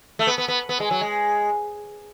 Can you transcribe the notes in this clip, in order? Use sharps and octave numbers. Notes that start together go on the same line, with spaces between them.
A3
B3
B3
B3
B3
G#3
F#3
G#3